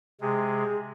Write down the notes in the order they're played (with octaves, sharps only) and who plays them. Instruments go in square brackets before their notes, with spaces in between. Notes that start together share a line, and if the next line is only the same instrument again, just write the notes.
[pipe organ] C3 G#3 [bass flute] G#4